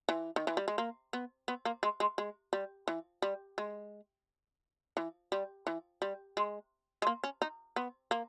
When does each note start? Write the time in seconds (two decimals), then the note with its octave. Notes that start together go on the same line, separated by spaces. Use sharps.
0.09 E3
0.36 D#3
0.47 E3
0.57 G3
0.68 G#3
0.78 A#3
1.13 B3
1.48 B3
1.65 A#3
1.83 G#3
2.00 G#3
2.18 G#3
2.53 G3
2.88 E3
3.22 G3
3.58 G#3
4.97 E3
5.32 G3
5.67 E3
6.02 G3
6.37 G#3
7.02 G#3
7.07 A#3
7.24 C#4
7.42 D#4
7.76 B3
8.11 A#3